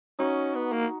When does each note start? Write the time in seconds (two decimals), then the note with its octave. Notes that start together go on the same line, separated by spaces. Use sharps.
0.19 C#4 D#4 F#4
0.55 B3
0.72 A#3